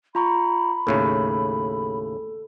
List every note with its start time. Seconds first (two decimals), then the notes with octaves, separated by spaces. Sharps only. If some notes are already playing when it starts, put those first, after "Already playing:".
0.15 F4 A#5 B5 C#6
0.87 D#2 A2 C#3 A4